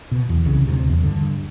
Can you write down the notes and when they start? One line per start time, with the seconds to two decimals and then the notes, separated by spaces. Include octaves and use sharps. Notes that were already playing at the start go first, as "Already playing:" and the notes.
0.11 B2
0.29 E2
0.45 C2 C#3
0.68 D2 C3
0.90 E2
1.03 G2 D3